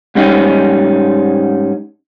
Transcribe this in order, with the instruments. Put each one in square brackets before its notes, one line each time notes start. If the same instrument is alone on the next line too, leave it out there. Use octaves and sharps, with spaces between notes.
[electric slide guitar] G#2 G3 C#4 D#4